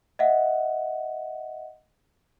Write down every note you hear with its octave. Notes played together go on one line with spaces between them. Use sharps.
D#5 E5 F#5